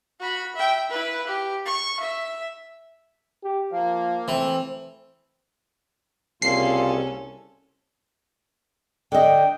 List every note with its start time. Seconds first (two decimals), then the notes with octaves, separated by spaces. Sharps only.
0.20 F#4 B5
0.56 E5 G5
0.90 E4 B4
1.27 G4
1.66 C#6
2.00 E5
3.43 G4
3.72 F3 A#3
4.28 E3 A3 C4
6.42 C2 C#3 A#3 C#4 F4 A4 C7
9.12 D3 D#5 G5